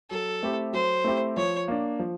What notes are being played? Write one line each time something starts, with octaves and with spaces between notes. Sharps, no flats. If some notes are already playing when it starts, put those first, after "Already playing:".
F#3 A4
A3 C4 E4 G4
F#3 C5
A3 C4 E4 G4
F3 C#5
A#3 D4
F3